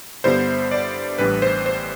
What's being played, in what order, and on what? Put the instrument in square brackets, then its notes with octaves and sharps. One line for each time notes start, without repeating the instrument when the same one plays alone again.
[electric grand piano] G2 D3 G3 B3 E4 C5
D5
A1 A2 E3 G3 D4 B4
C5
C5